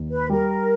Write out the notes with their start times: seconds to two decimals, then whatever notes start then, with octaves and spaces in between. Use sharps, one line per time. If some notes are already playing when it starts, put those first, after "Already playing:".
Already playing: D#2
0.11 B4
0.30 G3 A#4